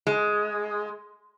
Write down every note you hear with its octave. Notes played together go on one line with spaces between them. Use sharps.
G#3